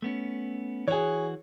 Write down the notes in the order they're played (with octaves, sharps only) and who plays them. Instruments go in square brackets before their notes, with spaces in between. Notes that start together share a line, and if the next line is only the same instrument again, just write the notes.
[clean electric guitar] A3 B3 C#4
[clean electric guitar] E3 F#4 [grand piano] G#4 C#5